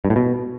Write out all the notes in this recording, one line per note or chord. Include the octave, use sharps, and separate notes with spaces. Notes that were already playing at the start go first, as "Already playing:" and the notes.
G2
A2
B2